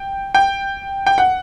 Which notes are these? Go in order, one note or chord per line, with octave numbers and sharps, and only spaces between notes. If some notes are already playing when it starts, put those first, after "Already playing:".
Already playing: G5
G5
G5
F#5